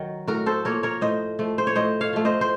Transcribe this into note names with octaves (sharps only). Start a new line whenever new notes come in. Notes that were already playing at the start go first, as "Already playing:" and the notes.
Already playing: D#3 F#3
A2 F#4 A#4
A4 C5
F3 A#3 A#4 C#5
A#4 C#5
A2 C5 D#5
F3 A3
C5
C#5
A2 C5 D#5
C#5 F5
F3 A3
C5 D#5
C5